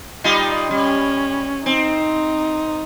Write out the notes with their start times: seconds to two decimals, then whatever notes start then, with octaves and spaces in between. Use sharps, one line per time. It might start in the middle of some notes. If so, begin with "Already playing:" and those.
0.24 G3 D#4 F4
0.71 G3 C#4
1.66 C4 D#4